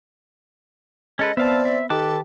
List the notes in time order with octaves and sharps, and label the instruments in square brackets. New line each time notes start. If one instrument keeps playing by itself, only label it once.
[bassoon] G#3 [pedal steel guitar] C#4 A4 B4 [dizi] D#5
[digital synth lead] B3 [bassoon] C4 [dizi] D5 [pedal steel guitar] E5 F5 A5
[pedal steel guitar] E5
[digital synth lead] D#3 [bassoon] G4 [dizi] A4 [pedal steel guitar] B4 A5 D6